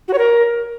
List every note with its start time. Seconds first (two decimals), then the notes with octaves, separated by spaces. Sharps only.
0.08 F#4
0.13 C#5
0.18 A#4